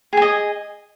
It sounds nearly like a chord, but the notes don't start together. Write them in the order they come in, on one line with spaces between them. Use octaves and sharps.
G#4 G#5 D#5